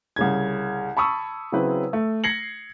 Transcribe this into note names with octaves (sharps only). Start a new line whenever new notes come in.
C2 C#3 G#6
A5 B5 C#6 D#6 E6
C#3 F#3 C4 E4 B4
A3
G#6 A#6 C7 C#7 F#7